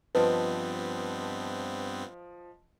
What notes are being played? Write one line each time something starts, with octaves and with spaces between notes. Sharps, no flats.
G2 F3 B3 C4 B4 D#5 A5